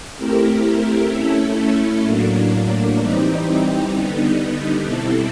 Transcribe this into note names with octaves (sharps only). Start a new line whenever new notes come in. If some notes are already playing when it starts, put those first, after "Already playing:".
A3 C4 E4 G4 A#4
A3 C#4 E4 A4
A2 F#3 A#3 D4
E3 G3 C4 D#4 G4
D3 G3 B3 D#4
B2 G3 C4 E4 A4